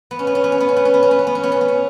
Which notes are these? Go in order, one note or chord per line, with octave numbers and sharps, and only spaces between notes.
B3
C#4
B3
C#4
B3
C#4
B3
C#4
B3
C#4
B3
C#4
B3
C#4
B3
C#4
B3
C#4
B3
C#4